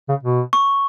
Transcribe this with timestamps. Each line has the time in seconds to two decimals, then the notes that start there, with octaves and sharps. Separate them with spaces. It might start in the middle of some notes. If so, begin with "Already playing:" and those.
0.09 C#3
0.23 B2
0.53 C#6